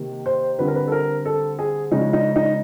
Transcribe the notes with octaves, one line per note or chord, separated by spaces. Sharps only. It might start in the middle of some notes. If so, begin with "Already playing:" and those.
Already playing: C3 D#3 A#3
C5
D3 G3 C4 B4
A#4
B4
A4
A#4
A4
G#4
C#3 F3 G#3 C#4 D#4
D#4
D#4